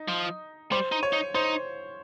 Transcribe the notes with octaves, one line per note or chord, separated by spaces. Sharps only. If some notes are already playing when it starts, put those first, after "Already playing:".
Already playing: D#4
F3
G3 C5
D#4
C#5
D#4
D#4 C5